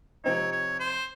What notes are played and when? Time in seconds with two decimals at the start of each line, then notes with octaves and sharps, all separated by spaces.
0.24 C3 F3 C4 D#4 C#5
0.52 C#5
0.80 C5